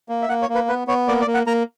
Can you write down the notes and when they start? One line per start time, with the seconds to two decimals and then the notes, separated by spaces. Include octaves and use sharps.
0.09 A#3
0.22 E5
0.29 A#3 F#5
0.42 C#5
0.49 A#3
0.55 B4
0.69 B3 B4
0.88 B3 C#5
1.08 A#3 D5
1.21 D5
1.27 A#3
1.34 F#5
1.47 A#3 A#5